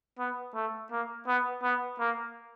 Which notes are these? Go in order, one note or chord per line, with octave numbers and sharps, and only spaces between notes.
B3
A3
A#3
B3
B3
A#3